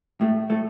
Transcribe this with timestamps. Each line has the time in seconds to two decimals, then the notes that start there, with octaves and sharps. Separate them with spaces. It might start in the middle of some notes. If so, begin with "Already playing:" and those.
0.21 A2 A3
0.50 A2 A3